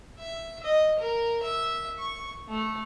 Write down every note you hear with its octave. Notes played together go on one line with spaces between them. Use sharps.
E5
D#5
A#4
E5
C#6
A3